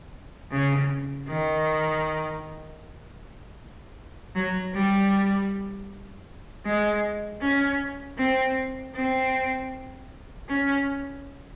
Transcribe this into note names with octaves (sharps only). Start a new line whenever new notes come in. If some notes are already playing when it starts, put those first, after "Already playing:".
C#3
D#3
F#3
G3
G#3
C#4
C4
C4
C#4